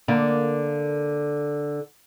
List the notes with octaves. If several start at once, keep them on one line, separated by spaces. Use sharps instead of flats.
D3 A#3